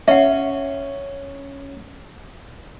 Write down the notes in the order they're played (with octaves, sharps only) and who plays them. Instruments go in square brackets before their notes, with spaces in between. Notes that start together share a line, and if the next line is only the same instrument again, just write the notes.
[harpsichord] C#4 [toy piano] E5 F#5